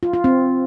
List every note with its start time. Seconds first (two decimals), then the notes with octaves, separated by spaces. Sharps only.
0.03 F4
0.13 F4
0.24 C4